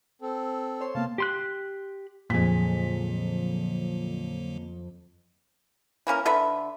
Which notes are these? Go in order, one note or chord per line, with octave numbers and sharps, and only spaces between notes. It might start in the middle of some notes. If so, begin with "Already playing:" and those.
C4 A4
C5 C#5 C6
C3 A#3 B3 F5 A5
G4 C6 F#6
F2 A#2 D3 F#3 A#3 G#4 B6
E3 A#3 C#4 A#4
D3 A4 B4 E5